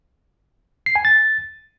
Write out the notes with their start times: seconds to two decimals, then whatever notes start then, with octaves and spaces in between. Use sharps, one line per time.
0.86 C7
0.96 G#5
1.05 A6